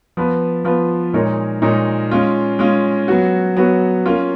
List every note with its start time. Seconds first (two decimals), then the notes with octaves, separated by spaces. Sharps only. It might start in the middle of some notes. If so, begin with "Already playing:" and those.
0.17 F3 B3 F4 B4
0.65 F3 B3 F4 B4
1.13 A#2 G#3 D#4 A#4 C#5
1.62 A#2 G#3 D#4 A#4 C#5
2.11 G#3 C#4 F4
2.59 G#3 C#4 F4
3.08 F#3 B3 F#4
3.57 F#3 B3 F#4
4.06 A#3 C#4 F4